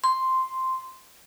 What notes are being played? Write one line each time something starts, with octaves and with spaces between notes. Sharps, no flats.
C6